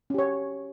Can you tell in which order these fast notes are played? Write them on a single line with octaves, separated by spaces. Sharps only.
C#4 G4 C#5